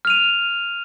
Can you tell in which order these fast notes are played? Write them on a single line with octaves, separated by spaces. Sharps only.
F6 F7 D#7